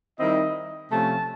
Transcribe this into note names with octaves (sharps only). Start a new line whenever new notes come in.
D#3 G3 C4 E4 D#5
C3 F3 A3 C#4 A5